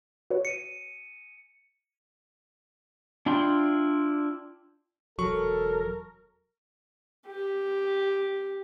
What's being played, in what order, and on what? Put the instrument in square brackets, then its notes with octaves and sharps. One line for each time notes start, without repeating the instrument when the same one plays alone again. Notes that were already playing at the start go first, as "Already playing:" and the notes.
[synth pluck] F#4 B4 C#5
[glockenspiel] C#7 D#7
[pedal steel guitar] D4 E4 F4 G5 C6
[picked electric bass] E1 F#3 [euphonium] A4 [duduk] A#4 [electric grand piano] C#6
[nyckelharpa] G4